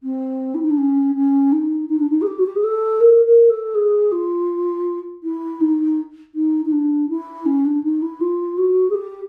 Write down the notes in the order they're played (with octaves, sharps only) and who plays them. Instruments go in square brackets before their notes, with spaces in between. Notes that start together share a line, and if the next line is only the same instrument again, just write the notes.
[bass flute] C4
E4
D#4
D4
C#4
C#4
D#4
D#4
D4
D#4
G#4
G4
F#4
G4
G#4
A4
A#4
A#4
A4
G#4
F4
E4
D#4
D#4
D#4
D4
E4
C#4
D4
D#4
E4
F4
F#4
G#4
G4